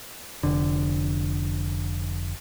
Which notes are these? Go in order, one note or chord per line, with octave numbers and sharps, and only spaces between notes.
F1 D3